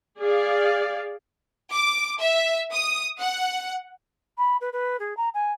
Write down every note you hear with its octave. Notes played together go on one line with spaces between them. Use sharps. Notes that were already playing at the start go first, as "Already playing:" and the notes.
G#4 D5 F5
D6
E5
D#6
F#5
B5
B4
B4
G#4
A#5
G#5